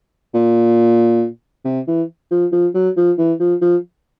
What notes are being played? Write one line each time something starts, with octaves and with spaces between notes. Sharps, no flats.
A#2
C3
E3
F3
F3
F#3
F3
E3
F3
F3